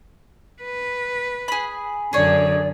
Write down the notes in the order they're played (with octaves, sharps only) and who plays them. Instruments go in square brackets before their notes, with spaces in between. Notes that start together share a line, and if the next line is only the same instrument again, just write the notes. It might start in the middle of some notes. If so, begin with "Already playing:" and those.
[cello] B4
[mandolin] G#4 B5
[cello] F#2 D3 [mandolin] G#4 C#5 [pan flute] D5